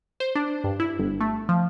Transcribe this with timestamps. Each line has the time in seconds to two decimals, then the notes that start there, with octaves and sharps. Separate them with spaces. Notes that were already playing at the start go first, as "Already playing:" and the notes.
0.20 C5
0.35 D4
0.64 G2
0.80 E4
0.99 G1
1.21 A3
1.49 F3